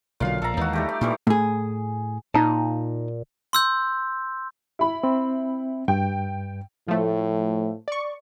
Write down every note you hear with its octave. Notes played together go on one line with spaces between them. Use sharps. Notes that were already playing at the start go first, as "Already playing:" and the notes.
B1 A#2 D3 F#3 F5
A#1 A4 A#5
D#2 E3 G#3 D#4 F#4
G3 A3 G4
D5
A#2 D#3 E3 G3
A2 G#4
A#2 D#4 A5
C6 E6 G6
E4 B5
C4
G2 G5
A2 F3 A3
D5 C#6